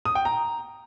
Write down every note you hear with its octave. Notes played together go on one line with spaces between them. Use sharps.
D#6
G5
A#5